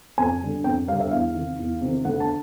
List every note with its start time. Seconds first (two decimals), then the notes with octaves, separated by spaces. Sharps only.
0.18 F2 G#5
0.42 D3 G3
0.64 F2 G5
0.88 G3 F5
0.92 D3
1.00 E5
1.11 E2 F5
1.34 C3 D#3
1.59 E2
1.81 C3 D#3
2.05 D2 F#5
2.20 A5